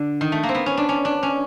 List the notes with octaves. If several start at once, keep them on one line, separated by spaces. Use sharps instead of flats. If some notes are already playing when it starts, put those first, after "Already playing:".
Already playing: D3
D#3
A3
A#3
C4
B3
C#4
D4
C#4
D4
C#4